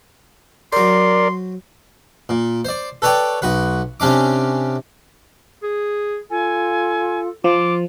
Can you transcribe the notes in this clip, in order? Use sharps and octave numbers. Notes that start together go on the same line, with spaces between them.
F#3 A#4 C5 D5 C6
A#2
C5 D5
A4 B4 C#5 D5 G5
B1 F#4 B4
C3 C#4 D4 D6
G#4
F4 A4 G#5
F3 F4 D6